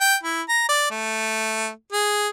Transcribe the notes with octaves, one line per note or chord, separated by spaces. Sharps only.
G5
E4
A#5
D5
A3
G#4